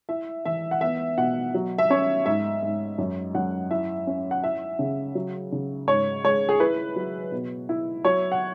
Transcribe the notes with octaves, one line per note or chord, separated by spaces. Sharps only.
E4 E5
E3 E5
F#5
B3 E5
B2 F#5
F#3
E5
C#4 C#5
G#2 E5
G#2
F#2
F#2 F#5
E4 E5
C#4
F#5
E4 E5
C#3
F#3
C#3
G#2 C#5
G#3 C#5
G#4
E4 B4
F#3
B2
E4
F#3 C#5
F#5